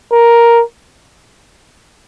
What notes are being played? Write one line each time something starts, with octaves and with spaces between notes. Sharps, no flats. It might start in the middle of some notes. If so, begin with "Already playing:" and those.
A#4